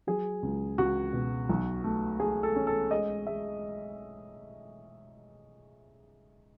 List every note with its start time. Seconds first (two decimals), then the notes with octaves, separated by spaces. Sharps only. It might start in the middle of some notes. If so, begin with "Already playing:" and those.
0.07 F#3 G#4
0.43 C#2
0.78 C#2 F#4
1.13 B2
1.49 B1
1.84 A3
2.20 A3 G#4
2.43 A4
2.56 C#4
2.67 A4
2.91 G#3 D#5
3.26 G#3 E5